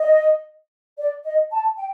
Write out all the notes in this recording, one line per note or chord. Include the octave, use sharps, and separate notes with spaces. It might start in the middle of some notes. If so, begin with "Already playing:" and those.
Already playing: D#5
D5
D#5
A5
G5